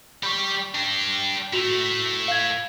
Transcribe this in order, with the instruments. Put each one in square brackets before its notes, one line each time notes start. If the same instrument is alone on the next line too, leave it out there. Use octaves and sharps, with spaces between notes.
[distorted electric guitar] G4 D5 [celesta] B5 C#6
[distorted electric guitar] D4 G4
[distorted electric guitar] A3 E4 [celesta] F#4 F7
[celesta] F5 G#6